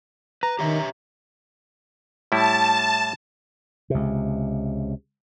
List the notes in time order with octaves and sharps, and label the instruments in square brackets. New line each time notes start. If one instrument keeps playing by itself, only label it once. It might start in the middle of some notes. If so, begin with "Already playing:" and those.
[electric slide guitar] B4 [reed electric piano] A#5
[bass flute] D#3 [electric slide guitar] G4 C#5 E5
[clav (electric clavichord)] A2 G3 E4 [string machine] A5
[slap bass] C#2 C3